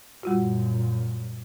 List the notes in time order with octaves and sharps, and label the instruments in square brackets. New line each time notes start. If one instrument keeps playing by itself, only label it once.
[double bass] F#2 A#2 [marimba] G3 F4 F#4